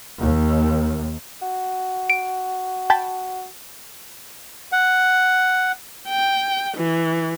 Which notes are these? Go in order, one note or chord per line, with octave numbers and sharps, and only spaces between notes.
D#2
F#4
D7
G5 A5 B5
F#5
G5
E3